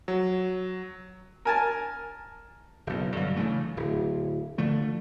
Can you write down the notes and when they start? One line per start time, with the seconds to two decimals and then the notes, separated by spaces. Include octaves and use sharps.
0.08 F#3
1.45 A#4 G#5 A5
2.87 F#1 B1
3.17 G2 D3 F#3
3.36 C#3 E3 A3
3.77 D1
4.58 D3 F3 A3